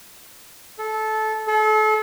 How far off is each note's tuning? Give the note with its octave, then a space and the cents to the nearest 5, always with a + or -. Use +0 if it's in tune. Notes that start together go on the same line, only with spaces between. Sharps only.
A4 -20
A4 -35